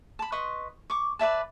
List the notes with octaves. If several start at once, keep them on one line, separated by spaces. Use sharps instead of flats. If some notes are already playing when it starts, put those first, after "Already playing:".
A5 B5
B4 D#5 C6 C#6
C#6 D6
B4 D5 E5 A5